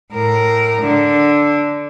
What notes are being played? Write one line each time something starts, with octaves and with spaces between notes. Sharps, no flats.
A2 A#4
D3